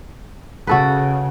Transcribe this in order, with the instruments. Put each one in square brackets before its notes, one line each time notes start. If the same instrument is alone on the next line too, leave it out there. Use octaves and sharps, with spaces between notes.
[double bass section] C#3 [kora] F#4 A4 B4